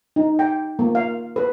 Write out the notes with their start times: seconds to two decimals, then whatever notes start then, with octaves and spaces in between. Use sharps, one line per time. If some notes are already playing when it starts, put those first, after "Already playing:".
0.16 D#4
0.39 G5
0.79 A#3
0.95 F5
1.36 B4